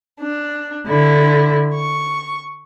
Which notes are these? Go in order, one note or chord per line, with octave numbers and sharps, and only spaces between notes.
D4
D3 E4
C#6